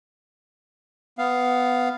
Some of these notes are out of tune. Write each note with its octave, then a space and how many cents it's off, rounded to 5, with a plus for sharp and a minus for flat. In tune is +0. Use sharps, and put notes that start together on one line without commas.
B3 +15 F5 +0